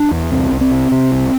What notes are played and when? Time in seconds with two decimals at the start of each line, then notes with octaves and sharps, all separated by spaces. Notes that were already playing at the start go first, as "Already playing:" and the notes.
Already playing: D4
0.11 E2
0.31 C2 C4
0.51 C2
0.61 C4
0.71 C3
0.91 C3
1.12 C2